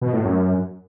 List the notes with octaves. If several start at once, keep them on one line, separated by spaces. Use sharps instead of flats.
B2
A2
F#2